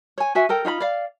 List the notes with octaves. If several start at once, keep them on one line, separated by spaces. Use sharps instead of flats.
C#5 G#5
F#4 E5 G#5
A4 A#4 G5
D#4 F4 F5 B5
D5 F5